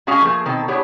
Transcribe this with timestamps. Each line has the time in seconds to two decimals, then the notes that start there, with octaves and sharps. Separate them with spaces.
0.07 G#3 C#4 F#4 G#4 F5 A5
0.22 F3 A3 A#3 G#4
0.45 B2 D#3 C4 A4
0.68 B3 D4 E4 G4 G#4 C#5